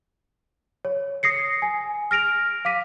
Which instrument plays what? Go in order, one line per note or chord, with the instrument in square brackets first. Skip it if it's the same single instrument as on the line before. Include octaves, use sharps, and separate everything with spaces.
[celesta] C#5
D#6 A#6 C7 C#7
G#5
F6 A#6 D7 F7
F5 D6 B6 D#7